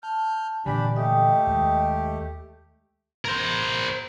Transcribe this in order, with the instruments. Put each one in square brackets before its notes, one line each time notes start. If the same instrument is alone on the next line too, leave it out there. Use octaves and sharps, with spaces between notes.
[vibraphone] A5 [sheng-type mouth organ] F6 G6
[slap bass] A#2 D3 E3 [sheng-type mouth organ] D4 G4 B5 [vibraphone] G#5
[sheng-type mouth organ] A3 G4 [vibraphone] D#5 G5 D#6
[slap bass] D#2 G#3
[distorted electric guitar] A#4 C5